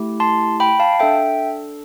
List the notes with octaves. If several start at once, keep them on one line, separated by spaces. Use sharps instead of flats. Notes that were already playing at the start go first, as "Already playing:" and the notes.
Already playing: A3 E4 G4
A5 C6
G5 B5
F5 A5
D4 A4 E5 G5